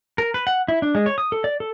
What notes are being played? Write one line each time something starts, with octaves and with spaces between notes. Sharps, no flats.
A#4
B4
F#5
E4
D4
G#3
C#5
D#6
A4
D5
A4